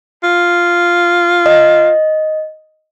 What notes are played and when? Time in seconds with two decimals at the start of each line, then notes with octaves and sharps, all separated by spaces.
0.23 F4
1.46 D#5